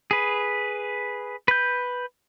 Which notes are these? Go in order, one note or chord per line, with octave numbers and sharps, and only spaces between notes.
G#4 B4
B4 G6